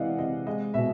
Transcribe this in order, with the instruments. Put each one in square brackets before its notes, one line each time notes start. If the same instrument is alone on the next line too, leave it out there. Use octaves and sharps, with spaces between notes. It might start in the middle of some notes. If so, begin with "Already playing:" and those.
Already playing: [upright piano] C3 E3 G#3 D5 D#5 F5 F#5
C3 D#5
G#3 D#5
B2 E5